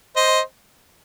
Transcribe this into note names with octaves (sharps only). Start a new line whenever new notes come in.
C5 D#5